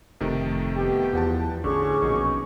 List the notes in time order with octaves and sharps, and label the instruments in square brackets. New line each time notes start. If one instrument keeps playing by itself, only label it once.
[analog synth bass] F1 [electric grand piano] C3 D#3 A3
[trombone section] B3 G4
[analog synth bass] E2 [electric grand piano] F3 F#5 A5
[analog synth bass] A1 [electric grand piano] D3 [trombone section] C#4 [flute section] G#4 C#6 D6
[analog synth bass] A#1 [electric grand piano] B2 D#4